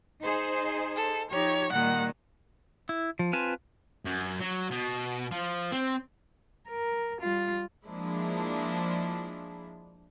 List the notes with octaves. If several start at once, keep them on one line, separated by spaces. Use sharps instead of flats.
D#4 G#4 C5
A4
F3 D#4 G4 C#5
A#2 D#3 G3 F#5
E4
F3
C4 F4 B4 G#5 A5
F#2
F#3
B2
F3
C4
A#4
G3 F4
F3 G#3 A#3 D4 E4